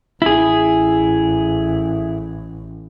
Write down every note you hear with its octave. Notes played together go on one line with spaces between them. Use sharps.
A1 E4 G#4